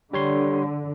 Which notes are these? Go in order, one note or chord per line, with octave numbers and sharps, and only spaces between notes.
D3 G3 C#5 C6